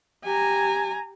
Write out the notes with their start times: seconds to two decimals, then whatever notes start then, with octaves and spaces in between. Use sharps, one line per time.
0.24 G4 G#5 A#5